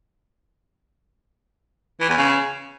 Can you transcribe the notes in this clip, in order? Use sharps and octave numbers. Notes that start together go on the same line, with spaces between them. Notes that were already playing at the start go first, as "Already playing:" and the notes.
E3
E2
C#3